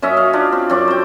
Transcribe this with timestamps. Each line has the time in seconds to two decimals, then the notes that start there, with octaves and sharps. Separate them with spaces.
0.02 F#2 C#4 D#5 E5
0.17 F5
0.33 D4 F4
0.52 C4
0.70 F#2 C4 D5
0.88 C5 G5